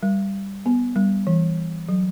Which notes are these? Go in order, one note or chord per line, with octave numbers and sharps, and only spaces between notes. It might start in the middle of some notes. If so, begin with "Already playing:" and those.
G3
B3
G3
E3
F#3